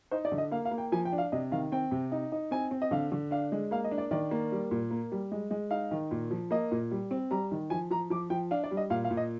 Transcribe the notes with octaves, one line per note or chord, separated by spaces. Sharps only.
D#4 C5
D5
D3
D#5
A#3 F5
F5
A#3
G5
F3 G#5
G5
D4
F5
C3 D#5
D#3 F5
C4 G5
C3
D#4
D#4
C4 G#5
C4
D#5
D3 F5
D3
D4 F5
G#3
A#3 F5
D#5
D4
D5
D#3 D5
A#3
G3
A#2
A#3
G3
G#3
G#3
D#4 F5
D#3
A#2
F3
A#3 D#5
A#2
G3
C4
G3 A#5
D#3
F3 G#5
F3 A#5
F3 D6
F3 G5
D4 F5
D5
G3
D#5
A#2 F5
F5
A#2
D#5